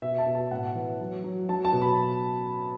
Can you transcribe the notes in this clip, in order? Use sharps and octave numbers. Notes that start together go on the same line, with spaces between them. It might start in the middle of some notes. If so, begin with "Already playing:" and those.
B2 E5
A5
B2
A5
A2 F#5
E3
F#3
F#3
F#3 A5
A5
B2
B5